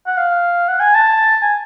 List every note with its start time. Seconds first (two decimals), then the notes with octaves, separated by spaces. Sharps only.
0.07 F#5
0.18 F5
0.68 F#5
0.80 G#5
0.95 A5
1.42 G#5